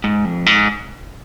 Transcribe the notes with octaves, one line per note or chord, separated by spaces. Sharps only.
G#2
F2
G#2